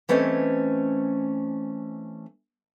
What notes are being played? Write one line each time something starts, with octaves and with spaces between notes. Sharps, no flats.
E3 A3 C4 C#4 D#5